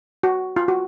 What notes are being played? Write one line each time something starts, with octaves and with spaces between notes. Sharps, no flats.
F#4
F4
F#4